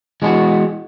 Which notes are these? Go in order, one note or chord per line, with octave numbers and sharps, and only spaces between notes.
E3 G#3 B3 D4 F#4